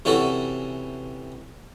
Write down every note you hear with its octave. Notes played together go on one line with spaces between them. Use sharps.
C3 E3 C#4 F#4 A4